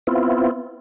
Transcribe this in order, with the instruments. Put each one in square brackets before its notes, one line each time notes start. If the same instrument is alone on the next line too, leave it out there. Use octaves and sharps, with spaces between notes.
[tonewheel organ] B3 C4 E4 F4